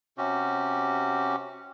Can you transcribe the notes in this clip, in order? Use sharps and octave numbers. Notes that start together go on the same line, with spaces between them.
C3 C#4 F#4 G4